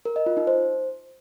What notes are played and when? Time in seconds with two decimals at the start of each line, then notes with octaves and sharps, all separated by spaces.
0.05 A#4
0.16 D#5
0.26 F4
0.37 D#4
0.47 C5